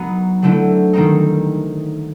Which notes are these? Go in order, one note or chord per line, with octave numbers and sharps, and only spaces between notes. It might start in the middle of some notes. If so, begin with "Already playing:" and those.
Already playing: F#3 B3 D#4
D3 F#3 A3 C4 E4
D#3 G3 C4 D#4